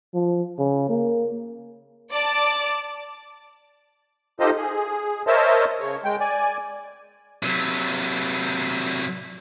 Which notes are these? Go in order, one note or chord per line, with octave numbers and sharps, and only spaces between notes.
F3
C#3
A#3
D5 A5 D6
D#4 F4 G4 A4 C5 D#5
G#4
A#4 C5 C#5 D#5 E5 A5
C#3 C#5
G#3 G5
D5 G#5
C3 F#3